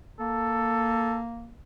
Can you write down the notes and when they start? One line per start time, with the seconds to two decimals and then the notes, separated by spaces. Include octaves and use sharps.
0.20 A#3 A4